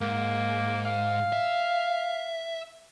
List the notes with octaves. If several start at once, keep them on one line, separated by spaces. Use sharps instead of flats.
G#2 A#3
F5
E5